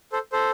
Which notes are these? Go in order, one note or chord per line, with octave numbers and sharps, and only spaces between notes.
A4 C5
A4 C5